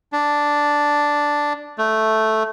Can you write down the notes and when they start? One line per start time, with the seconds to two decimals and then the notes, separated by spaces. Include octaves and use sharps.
0.12 D4
1.78 A3